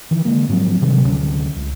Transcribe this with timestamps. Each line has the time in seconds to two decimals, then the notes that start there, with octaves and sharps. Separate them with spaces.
0.11 D#3 E3
0.25 D3 G#3 A#3
0.49 G#2 F3 F#3 C4
0.82 C3 D#3 F#3 G3
1.03 D2 G#3 C#4
1.56 C#2